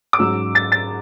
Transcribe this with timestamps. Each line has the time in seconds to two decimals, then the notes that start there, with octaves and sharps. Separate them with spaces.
0.13 D6
0.18 G#2 F#3 C#4 E6
0.55 A6
0.72 A6